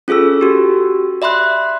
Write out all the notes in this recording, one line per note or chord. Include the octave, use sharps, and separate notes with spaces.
C#4 F4 G#4 A4 E6
F#4 G4
D5 E5 B5 C6 F#6